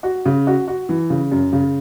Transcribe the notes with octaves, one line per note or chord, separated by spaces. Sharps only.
F#4
C#3
F#4
F#4
E3
C#3
F#2
C#3